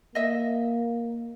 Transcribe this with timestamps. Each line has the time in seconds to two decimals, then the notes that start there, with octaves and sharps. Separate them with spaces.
0.15 A#3 D#5 E5